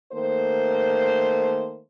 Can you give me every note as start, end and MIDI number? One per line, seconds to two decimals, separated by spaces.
0.13 1.81 51
0.13 1.81 57
0.13 1.81 58
0.13 1.81 72